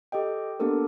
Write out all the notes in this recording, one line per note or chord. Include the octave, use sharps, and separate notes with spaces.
G4 A4 D#5 G5
A#3 B3 D4 G4 A4 A#4